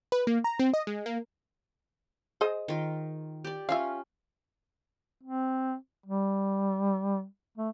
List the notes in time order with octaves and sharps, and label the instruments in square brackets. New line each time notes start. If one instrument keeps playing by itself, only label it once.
[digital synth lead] B4
A#3
A#5
C4
D#5
G#3
A#3
[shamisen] G#4 C5 D#5
[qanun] D#3 F4
G4 D5
[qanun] C#4 F4 [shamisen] E5 F5
[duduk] C4
G3
A3